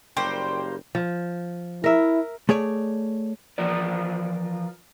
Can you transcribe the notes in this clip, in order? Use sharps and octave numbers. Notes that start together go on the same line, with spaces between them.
F#1 G3 A#3 C5 G5 C#6
F3
E4 A#4 E5
A3 G#4 C#5 D5
E3 F3 F4 A#4 D5